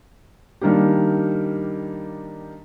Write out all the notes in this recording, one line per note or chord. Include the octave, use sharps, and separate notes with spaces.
D#3 G3 A#3 D4 G4